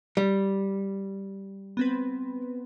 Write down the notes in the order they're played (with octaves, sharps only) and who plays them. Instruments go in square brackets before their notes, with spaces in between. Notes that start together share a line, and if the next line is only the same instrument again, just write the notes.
[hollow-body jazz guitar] G3
[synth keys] B3 C4 B4